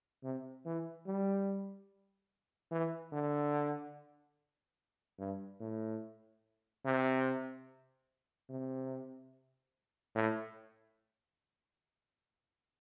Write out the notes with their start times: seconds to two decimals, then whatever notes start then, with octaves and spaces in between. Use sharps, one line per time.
0.24 C3
0.65 E3
1.07 G3
2.72 E3
3.12 D3
5.19 G2
5.60 A2
6.85 C3
8.50 C3
10.15 A2